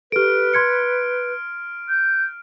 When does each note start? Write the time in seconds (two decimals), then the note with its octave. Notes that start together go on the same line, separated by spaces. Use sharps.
0.12 G4 A4 B4 F6 D7
0.54 C6 G#6 C#7
1.89 G6